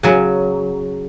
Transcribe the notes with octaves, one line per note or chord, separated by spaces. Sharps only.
C#3 F#3 C#4